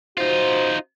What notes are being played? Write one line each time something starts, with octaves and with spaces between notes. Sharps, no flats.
D#4 F4 F#4 C5